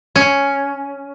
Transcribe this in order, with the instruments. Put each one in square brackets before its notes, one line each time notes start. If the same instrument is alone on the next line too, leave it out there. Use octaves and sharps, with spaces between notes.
[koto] C#4